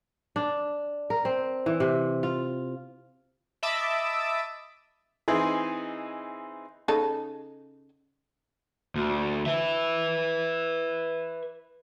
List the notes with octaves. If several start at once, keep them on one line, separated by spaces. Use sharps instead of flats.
D4
A#4
C4
E3
C3
F4
D#5 E5 A5 B5 D6 E6
E3 C4 D#4 G#4
C#3 D#4 A4
D2
B4 E5